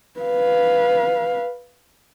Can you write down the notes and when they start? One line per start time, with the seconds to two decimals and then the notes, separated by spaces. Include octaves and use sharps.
0.20 B4 F5